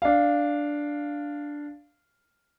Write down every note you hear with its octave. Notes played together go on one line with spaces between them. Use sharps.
D4 F5